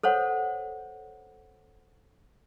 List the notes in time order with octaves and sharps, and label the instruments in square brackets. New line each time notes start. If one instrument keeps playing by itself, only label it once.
[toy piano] A4 C5 C#5 F#5